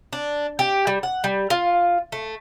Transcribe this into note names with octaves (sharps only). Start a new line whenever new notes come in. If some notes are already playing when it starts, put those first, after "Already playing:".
D4
G4
G3
F#5
G3
F4
A3